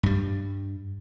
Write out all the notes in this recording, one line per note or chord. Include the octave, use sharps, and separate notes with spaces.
G2 G3